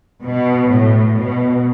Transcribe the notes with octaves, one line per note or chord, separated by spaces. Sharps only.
B2
A2
B2